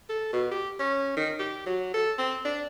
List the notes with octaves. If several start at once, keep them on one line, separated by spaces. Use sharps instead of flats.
A4
B2
G4
C#4
D#3
G4
F#3
A4
C4
D4